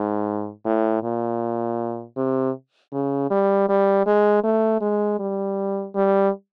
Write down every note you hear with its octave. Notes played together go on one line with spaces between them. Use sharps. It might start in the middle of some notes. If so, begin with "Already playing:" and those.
Already playing: G#2
A2
A#2
C3
C#3
G3
G3
G#3
A3
G#3
G3
G3